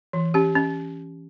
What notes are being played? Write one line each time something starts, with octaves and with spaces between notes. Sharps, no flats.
E3
C#4 G4
C#4